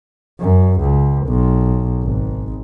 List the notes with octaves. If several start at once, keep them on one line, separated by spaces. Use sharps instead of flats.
F#2
C#2
B1
G#1